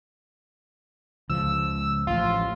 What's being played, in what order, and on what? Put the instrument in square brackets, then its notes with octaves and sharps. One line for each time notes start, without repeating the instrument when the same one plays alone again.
[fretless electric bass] C#2 F3 [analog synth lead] E6
[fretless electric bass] A1 F3 [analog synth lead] F4